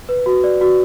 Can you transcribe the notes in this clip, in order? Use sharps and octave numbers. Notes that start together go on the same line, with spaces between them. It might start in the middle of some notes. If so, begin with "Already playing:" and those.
B4
F#4
D5
F#4